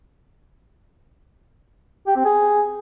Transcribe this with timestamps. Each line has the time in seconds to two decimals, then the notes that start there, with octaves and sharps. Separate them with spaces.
2.07 G4
2.16 C4
2.25 G#4